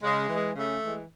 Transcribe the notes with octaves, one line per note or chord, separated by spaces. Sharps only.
C#3 G#3
E3 G#3
C#3 A3
E3 G#3